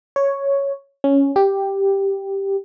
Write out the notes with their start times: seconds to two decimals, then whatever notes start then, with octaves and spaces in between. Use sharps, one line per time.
0.16 C#5
1.04 C#4
1.36 G4